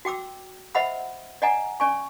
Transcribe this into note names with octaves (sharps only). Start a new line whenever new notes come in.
F#4 G5 D6 E6
C5 D#5 E5 F#5 B5 E6
D5 D#5 F#5 G#5 A#5
C#4 D5 G#5 C#6